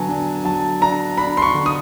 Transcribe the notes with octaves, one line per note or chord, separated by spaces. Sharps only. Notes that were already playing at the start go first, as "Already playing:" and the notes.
Already playing: D3 F#3 B3 G#5 A5
D4
F#3 A5
D4 A#5
D4 B5
C6
C#6
D3
D#6